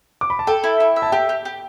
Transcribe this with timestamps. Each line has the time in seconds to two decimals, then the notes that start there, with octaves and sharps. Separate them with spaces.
0.21 D6
0.30 B5
0.39 A5
0.47 A4 G5
0.64 E4
0.80 E4
0.96 E5
1.02 A5
1.12 G4 G5
1.29 G4
1.45 G4